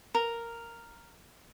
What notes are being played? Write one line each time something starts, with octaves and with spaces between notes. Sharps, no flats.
A#4